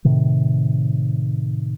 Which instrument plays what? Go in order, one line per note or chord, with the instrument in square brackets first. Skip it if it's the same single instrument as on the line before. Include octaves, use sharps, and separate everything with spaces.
[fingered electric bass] A2 C3 D#3